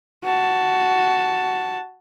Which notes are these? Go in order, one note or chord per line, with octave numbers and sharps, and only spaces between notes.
F#4 A5